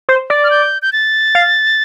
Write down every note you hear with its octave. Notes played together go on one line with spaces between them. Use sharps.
C5
D5
F6
G6
G6
A6
F5